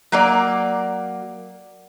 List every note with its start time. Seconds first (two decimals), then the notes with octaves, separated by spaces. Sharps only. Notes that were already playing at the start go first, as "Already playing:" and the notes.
0.12 F#3 A#3 D5